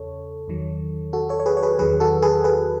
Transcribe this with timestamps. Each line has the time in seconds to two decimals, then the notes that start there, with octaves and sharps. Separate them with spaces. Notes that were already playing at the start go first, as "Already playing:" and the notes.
Already playing: E2 C#3 A4 C#5
0.48 E2 D#3 F#3
1.13 F#4 A4
1.29 A4 C#5
1.40 C#5
1.46 G#4 B4
1.57 C#5
1.63 G#4 B4
1.79 E2 D#3 F#3 G#4 B4
2.00 F#4 A4
2.22 G#4 B4
2.44 G#4 B4